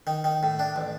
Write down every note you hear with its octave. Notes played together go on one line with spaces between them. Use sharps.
D#3
D#3
A2
D4
A1